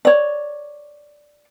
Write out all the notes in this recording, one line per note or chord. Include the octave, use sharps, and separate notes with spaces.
C#5 D5